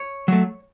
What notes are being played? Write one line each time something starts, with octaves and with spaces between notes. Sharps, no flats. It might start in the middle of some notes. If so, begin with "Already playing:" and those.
Already playing: C#5
F#3 A3